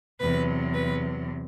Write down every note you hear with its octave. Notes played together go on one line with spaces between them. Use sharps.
E2 C3 F#3 B4
B4